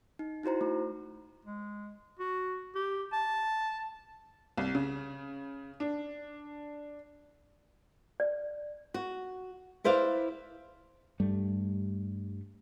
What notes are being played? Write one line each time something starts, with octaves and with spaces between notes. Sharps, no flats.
D#4
D#4 E4 F#4 C5 A#5
A3
G#3
F#4
G4
A5
C2
C#3
D4
D5
F#4
E4 B4 C5 D5 F5
G2 G3 A3